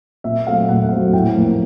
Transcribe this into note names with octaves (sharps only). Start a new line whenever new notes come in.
A#2 E5
F#3 A3 C4 F5
A#2 F#5
F#3 A3 C4
A2 G5
F3 A#3